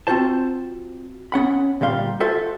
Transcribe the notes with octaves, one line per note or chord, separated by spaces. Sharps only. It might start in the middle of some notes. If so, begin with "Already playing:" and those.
C4 F4 F#4 C5 A5
B3 C#4 F#5 B5
D2 A#2 G3 F5 C6
F4 F#4 A4 C5 E5 F5